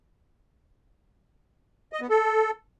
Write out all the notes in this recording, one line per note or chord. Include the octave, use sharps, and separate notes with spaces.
D#5
B3
A4